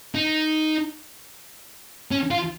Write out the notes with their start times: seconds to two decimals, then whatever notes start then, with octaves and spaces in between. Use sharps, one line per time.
0.15 D#4
2.11 C#4
2.31 F4